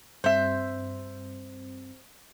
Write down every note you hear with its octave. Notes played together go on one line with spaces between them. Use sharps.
G2 C4 C5 E5